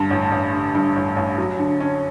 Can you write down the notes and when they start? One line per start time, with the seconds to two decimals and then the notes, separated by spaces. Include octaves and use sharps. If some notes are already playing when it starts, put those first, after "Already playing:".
Already playing: G2 D3
0.10 A1
0.32 A1
0.53 D3
0.75 G2
0.96 A1
1.16 A1
1.38 F#3
1.59 D3
1.81 C#4